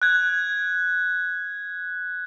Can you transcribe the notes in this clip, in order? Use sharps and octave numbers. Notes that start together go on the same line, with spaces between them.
F#6 G#6